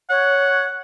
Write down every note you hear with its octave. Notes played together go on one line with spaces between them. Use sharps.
C#5 F#5